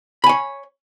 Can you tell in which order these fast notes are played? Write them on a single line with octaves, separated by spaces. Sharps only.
B5 G#5 C#5